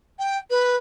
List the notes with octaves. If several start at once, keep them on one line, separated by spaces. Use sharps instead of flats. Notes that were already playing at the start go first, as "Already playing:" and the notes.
G5
B4